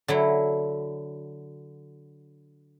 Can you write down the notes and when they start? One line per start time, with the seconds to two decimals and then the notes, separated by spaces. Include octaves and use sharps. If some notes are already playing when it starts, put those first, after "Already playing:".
0.08 D3 F#3 E4